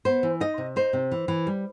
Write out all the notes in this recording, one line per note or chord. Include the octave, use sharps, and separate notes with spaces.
B3 C5
E3
D#4 D#5
C3
D#4 C5
C3
E3
E3
G3